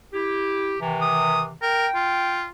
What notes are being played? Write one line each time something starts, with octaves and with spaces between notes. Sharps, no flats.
E4 G4
C3 D#3 E3
D#6
A#4 G5
F4